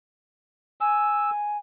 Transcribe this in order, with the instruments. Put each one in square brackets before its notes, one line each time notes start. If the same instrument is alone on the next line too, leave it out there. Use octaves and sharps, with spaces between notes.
[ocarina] G#5 [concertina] E6